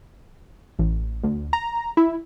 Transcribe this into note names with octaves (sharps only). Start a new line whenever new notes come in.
A1
D2
A#5
E4